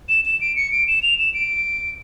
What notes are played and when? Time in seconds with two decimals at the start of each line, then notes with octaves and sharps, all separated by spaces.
0.09 E7
0.25 E7
0.41 D7
0.56 C#7
0.72 D7
0.88 E7
1.03 F7
1.18 E7
1.34 D7